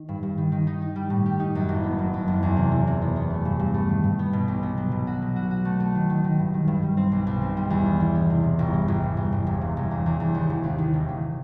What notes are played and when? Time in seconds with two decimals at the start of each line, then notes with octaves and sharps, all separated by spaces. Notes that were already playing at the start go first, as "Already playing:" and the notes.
Already playing: D#3
0.09 G2
0.23 G2
0.38 D#3
0.52 D#3
0.67 D#4
0.82 D#4
0.96 G3
1.10 A2
1.26 G4
1.40 D#4
1.55 F#2
1.69 F#1
1.83 B3
1.99 F#3
2.14 F#2
2.28 F#1
2.43 E2
2.57 C3
2.71 E3
2.87 C3
3.01 B3
3.16 B3
3.30 A3
3.45 G2
3.59 G2
3.74 A3
3.89 D#3
4.04 G2
4.19 B3
4.33 B2
4.48 B1
4.63 B3
4.77 F#3
4.92 B2
5.07 F#4
5.22 B2
5.36 F#4
5.51 F#4
5.65 A3
5.80 A3
5.95 D#3
6.10 D#3
6.24 D#3
6.39 G2
6.54 D#3
6.68 G2
6.82 G3
6.97 C4
7.12 B1
7.27 B1
7.42 C4
7.57 G3
7.70 E2
7.86 B3
8.00 E3
8.15 B3
8.30 C3
8.44 C3
8.59 G1
8.73 E3
8.88 G1
9.03 G2
9.17 G1
9.32 G1
9.47 E1
9.61 C3
9.77 E1
9.91 E2
10.06 E2
10.20 E2
10.35 D#2
10.50 E1
10.64 D#2
10.78 D#3
10.94 E1
11.09 D#3